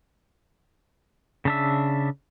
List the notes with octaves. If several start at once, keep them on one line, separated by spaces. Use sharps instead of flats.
C#3 D4 E5